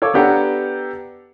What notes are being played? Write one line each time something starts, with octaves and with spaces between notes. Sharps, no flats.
A4 C#5 F5 D6
B3 D4 G4 A4 F#5 A#5